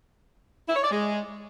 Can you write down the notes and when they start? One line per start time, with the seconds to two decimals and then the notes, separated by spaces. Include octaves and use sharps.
0.68 E4
0.76 C#5
0.83 D5
0.91 G#3